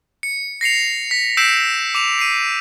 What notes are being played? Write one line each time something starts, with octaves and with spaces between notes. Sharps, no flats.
C#7
A#6 C7 C#7 F7
B6
E6 G6 B6 C7 D7 E7
D6 F7
C7 D#7